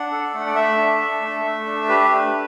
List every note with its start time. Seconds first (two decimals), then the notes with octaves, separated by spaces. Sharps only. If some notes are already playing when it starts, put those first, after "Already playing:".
Already playing: D4 F#5
0.11 A4
0.34 A3
0.46 D5
0.55 A3 E5
0.77 D4
1.00 A4
1.22 A3
1.44 A3
1.66 D4
1.89 G4 B4
2.11 A3